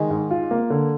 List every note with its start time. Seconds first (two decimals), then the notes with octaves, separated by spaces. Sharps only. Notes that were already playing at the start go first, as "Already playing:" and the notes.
Already playing: D#3 G#3
0.10 G#2
0.31 F4
0.51 A#3
0.70 D3